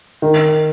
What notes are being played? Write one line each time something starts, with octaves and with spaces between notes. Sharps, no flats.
D#3